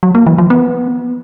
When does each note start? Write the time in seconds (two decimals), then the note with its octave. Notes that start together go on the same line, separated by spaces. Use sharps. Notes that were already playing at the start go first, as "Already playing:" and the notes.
0.03 F#3
0.15 A#3
0.27 E3
0.38 F3
0.50 B3